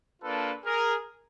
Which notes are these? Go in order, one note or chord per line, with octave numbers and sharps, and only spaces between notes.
A#3 D4 F4 A4 B4
G#4 A#4